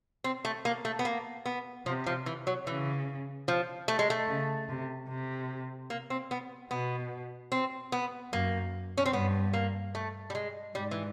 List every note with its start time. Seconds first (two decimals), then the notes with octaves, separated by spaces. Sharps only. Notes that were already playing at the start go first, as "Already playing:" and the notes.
0.24 C4
0.45 A3
0.65 A#3
0.85 A3
0.99 B3
1.05 A#3
1.46 B3
1.86 C3 F3
2.06 F3
2.26 E3
2.47 F#3
2.67 C#3 E3
3.48 F3
3.88 A3
3.99 G#3
4.10 A3
4.28 C#3
4.69 C3
5.09 C3
5.90 A#3
6.10 C4
6.31 B3
6.71 B2 B3
7.52 C4
7.92 B3
8.33 F#2 A#3
8.97 C#4
9.06 C4
9.13 G2 B3
9.53 A#3
9.95 A3
10.30 G3
10.35 G#3
10.75 G#2 G3
10.91 E3